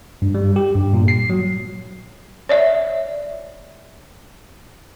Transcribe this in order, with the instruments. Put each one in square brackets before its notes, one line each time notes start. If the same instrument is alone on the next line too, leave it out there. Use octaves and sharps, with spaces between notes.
[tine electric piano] G2
G3
G4
G2
A#2
C7
F#3
[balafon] C#5 D5 E5